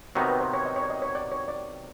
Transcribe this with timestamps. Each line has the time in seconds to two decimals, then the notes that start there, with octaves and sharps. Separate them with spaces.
0.15 C3 D#3 F#3 B3 D#4
0.29 B4
0.40 C5
0.53 C#5
0.65 D#5
0.76 C#5
0.83 D5
0.90 D#5
1.02 C#5
1.15 D5
1.32 C#5
1.48 D5